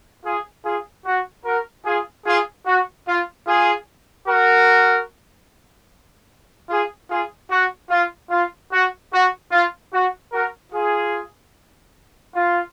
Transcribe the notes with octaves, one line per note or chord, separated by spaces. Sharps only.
F4 G#4
F4 G#4
F#4
F#4 A#4
F4 G#4
F4 G#4
F#4
F4
F4 G#4
F#4 A#4
F4 G#4
F4 G#4
F#4
F4
F4
F#4
F#4
F4
F#4
F#4 A#4
F4 G#4
F4